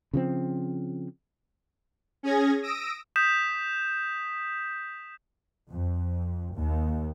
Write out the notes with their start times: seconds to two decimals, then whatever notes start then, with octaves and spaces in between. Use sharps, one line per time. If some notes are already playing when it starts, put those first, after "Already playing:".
0.14 C#3 F3 C4
2.23 C#4 G#4 G#6 A#6
2.62 D#6 E6 A#6 D7
3.16 D#6 G6 B6 E7
5.70 F2
6.55 D#2